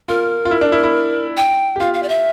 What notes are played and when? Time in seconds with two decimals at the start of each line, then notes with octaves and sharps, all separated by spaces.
0.08 F4 A#4
0.45 F4
0.51 E4
0.61 D4
0.72 E4
0.83 E4
1.37 G5
1.76 G4
1.80 F4 F5
1.94 F5
2.03 D5
2.09 E5